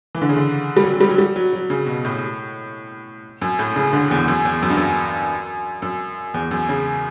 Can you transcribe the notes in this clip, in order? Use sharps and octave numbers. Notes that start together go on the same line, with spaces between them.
E3
D3
C#3
D3
G3
F#3
G3
F#3
G3
F#3
F#3
C#3
B2
A2
F#2
A2
C#3
D3
E2
F#2
E2
F#2
G2
F#2
F#2
E2
F#2
C#3